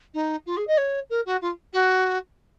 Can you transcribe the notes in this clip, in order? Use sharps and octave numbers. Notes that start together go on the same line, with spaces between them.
D#4
F4
G#4
D#5
C#5
A#4
F#4
F4
F#4